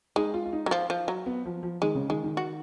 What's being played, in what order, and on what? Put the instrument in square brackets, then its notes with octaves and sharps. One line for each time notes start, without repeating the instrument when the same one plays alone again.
[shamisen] G#3 [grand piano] D#4
[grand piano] F4
F4
D#4
[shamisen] F#3
F3
F3
F#3
[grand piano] B3
F3
F3
[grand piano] D#3 [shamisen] G#3
[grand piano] C#3
[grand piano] D#3 [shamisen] G#3
[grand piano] D#3
[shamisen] F#4